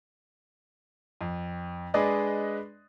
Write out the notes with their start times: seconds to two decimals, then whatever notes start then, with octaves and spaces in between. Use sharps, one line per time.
1.21 F2
1.94 G#3 D4 G#4 B4 D5 D#5